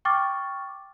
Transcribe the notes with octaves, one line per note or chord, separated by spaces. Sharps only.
G5 C#6 D6 F6 A6